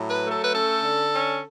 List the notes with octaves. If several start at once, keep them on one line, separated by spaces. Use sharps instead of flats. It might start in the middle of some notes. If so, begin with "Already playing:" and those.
Already playing: A2 F#3
B4
A3
A4
B4
C#4 A4
D3
C#4